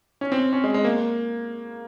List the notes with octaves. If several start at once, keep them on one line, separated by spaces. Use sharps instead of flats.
C#4
C4
C#4
G#3
G#3
A#3